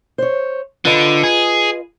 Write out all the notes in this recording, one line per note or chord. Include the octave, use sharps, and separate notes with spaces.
C5 C#5
D3 F4 B4 D#5
G#4